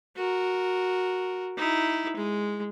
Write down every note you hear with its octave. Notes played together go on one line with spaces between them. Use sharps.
F#4 A#4
D#4 E4
G#3